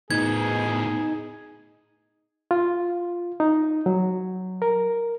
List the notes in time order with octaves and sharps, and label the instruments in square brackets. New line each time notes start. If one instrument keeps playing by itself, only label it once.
[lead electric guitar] A2 B3 [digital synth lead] D#4 [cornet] G#4 [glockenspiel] G#6
[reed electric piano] F4
D#4
F#3
A#4